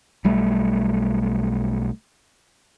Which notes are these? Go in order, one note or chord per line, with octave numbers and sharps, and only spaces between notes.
B1 G3 A3